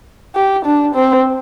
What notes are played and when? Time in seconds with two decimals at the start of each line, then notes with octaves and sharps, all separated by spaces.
0.36 G4
0.65 D4
0.95 C4